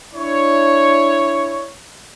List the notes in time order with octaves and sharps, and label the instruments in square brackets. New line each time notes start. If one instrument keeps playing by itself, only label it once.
[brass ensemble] D4 E4 C#5